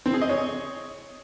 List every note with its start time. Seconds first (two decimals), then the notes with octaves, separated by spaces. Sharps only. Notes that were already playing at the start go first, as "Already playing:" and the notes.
0.06 C4
0.14 G#4
0.21 D#5
0.29 C#5